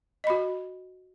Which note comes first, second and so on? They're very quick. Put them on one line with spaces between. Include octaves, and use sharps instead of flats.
D#5 B5 F#4